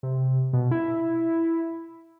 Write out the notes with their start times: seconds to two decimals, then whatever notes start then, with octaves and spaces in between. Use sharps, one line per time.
0.03 C3
0.53 B2
0.71 E4